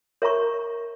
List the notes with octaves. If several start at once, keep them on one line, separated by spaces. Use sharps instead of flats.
A#4 C#5 E5 A#5 C#6